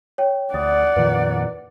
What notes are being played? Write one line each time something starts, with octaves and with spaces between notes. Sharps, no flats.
C#5 G5
D2 D5 F#5 D#6 A6
F2 A#2 D#3 B4